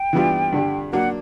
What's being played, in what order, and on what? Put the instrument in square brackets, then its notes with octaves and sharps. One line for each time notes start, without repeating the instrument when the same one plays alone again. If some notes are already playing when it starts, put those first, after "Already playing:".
Already playing: [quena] G5
[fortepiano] E3 G3 B3 D4 F4
G2 D3 G3
[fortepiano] F#3 A#3 D4 [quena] F#5